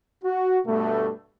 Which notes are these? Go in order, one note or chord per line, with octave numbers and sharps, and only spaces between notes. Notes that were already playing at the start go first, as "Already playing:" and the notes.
F#4
G2 B2 A3